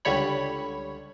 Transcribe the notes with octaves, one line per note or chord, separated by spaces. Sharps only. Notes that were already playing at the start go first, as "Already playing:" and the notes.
C#2 D3 G3 C#5 B5